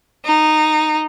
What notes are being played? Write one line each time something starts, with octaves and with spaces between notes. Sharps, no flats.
D#4